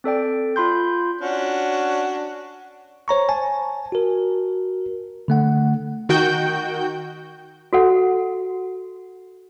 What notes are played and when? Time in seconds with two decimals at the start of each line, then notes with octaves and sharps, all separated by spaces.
0.04 C4 A4 D5 G5
0.56 F4 B5 C6 G6
1.21 C#4 D4 F#4
3.08 C5 C#5 A#5 C#6
3.29 G#5 A5
3.92 F#4 A#4
5.28 D3 A3 F#5
6.09 D#3 F#4 G5 G6
7.73 F#4 A4 F#5